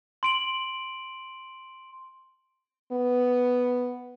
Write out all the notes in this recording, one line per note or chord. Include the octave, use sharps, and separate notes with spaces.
C6 D7 F#7
B3